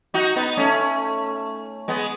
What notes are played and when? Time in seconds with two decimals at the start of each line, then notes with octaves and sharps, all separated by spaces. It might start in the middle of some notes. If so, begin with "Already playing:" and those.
0.14 D#4 F#4
0.36 B3 D#4
0.57 A3 C#4
1.88 G#3 B3